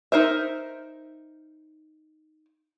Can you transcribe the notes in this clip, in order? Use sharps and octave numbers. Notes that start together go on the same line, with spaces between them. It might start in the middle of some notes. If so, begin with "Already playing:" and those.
D#4 A#4 C5 E5